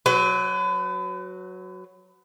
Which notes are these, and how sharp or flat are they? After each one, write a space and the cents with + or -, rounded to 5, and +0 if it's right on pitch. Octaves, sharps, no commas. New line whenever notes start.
F#3 +0 B4 +35